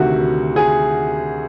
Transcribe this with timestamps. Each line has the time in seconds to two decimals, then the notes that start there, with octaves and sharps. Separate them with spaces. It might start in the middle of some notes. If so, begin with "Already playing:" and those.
Already playing: D2 C3 D#3 F#4
0.56 G#4